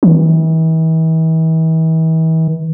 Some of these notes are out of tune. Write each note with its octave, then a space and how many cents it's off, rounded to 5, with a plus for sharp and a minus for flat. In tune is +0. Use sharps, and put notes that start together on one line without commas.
E3 -40